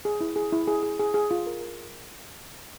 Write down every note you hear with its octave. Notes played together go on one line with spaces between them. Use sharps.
G#4
E4
G#4
E4
G#4
G#4
G#4
G#4
F4
A#4
A#4